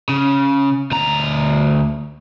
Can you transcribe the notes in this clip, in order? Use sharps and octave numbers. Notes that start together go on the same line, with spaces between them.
C#3
D2 A#5